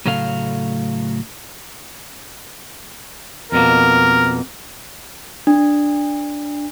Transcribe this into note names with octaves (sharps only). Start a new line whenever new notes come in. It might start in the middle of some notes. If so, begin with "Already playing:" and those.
A2 C#3 F#3 A3 A4 F5
F2 B2 A#3 A#4
D4